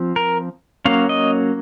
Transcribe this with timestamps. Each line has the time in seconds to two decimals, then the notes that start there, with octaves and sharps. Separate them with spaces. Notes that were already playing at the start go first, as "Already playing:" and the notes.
Already playing: F3 C4
0.16 A#4
0.85 F#3 A#3 C#4 F5
1.09 D#5